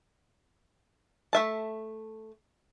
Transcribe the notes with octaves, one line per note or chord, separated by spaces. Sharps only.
A3 E5 A5